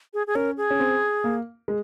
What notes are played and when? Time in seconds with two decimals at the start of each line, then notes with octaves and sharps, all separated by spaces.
0.14 G#4
0.27 G#4
0.35 C#4 A#4
0.57 G#4
0.70 C#4
0.80 C4
1.24 A#3
1.68 G#3